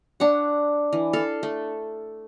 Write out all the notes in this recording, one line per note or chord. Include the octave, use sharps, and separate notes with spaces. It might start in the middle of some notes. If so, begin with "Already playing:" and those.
D4 C#5 F#5
E3
A4 F5
A3